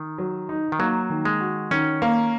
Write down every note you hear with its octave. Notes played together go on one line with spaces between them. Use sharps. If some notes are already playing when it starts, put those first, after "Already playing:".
Already playing: D#3
F#3
D#4
D#3
F#3 A#3
D#3
G#3
F#4
D#3 C#4
A#3